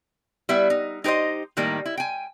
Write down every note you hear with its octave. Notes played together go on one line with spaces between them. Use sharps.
G3 B3 E4 E5
D#4
D#4 G4 B4 C5 D#5
A2 D#3 G3 A#3 D#4
E4
G5 G#5